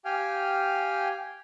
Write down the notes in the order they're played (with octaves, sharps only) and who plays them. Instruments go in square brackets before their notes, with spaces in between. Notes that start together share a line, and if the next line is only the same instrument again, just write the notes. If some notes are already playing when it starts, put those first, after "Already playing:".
[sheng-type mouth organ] G4 F5 G5 G#5 F6